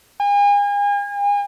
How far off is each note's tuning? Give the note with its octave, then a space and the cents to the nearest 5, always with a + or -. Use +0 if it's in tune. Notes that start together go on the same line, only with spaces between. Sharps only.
G#5 -40